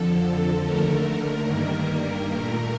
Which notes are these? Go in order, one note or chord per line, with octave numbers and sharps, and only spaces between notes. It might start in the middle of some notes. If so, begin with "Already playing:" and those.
Already playing: F2 D3 F3 A4
D#2 D3 A3 A#4
G2 D#3 G3 A#3 A#4
A#2 A3 A#4